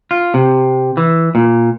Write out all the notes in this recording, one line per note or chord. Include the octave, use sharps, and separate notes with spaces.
F4
C3
E3
A#2